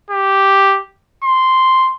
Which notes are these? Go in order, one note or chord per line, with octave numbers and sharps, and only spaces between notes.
G4
C6